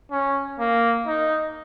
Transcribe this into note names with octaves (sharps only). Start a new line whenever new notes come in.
C#4
A#3
D#4